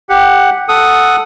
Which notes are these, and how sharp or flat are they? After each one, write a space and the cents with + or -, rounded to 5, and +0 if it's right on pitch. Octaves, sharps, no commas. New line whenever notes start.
G4 +10 F#5 +0
A4 +0 F#5 +0 D#6 +0